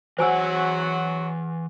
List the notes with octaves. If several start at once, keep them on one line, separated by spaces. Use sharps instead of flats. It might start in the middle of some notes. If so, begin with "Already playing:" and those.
E3 F#3 F#4 C5 F#5 G#5 E6